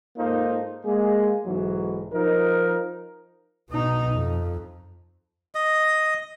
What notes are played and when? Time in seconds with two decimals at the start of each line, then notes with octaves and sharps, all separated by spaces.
0.18 G#2 A#3 D#4 F4 A4 C5
0.85 G#3 A#3 G#4
1.46 B1 G#2 E3 F#3
2.13 F3 D#4 A#4
3.70 B2 D#4
4.13 F2
5.55 D#5